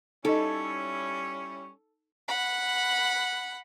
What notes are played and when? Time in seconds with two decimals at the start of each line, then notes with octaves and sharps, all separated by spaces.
0.25 G3 C#4 D#4 E4 A4 D#5
2.28 F#5 B5